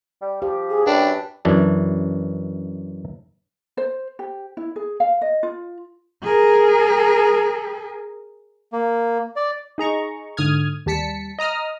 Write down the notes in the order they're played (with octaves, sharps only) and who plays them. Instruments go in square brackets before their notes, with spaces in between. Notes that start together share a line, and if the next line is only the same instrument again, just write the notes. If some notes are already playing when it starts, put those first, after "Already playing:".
[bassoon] G3
[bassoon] F3 [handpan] G4
[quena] G#4
[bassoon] F#2 [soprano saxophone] D4 [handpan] B4 [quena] G5
[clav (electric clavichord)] F#2 E3 D4
[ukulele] C5
G4
E4
G#4
F5
D#5
F4
[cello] G#4 A#4
[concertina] A#3
D5
[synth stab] D#4 G#4 A#5 C#6
G#2 D3 D#6 F6 G#6
D#2 G3 A5 B6 C#7
D#5 A#5 D#6 F6